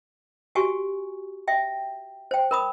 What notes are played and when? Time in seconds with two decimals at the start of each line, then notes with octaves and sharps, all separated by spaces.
0.55 F#4 G4 G#5 C#6
1.48 E5 G5
2.31 C5 G5
2.51 A#4 B5 D#6